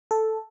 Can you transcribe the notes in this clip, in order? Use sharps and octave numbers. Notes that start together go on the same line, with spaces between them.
A4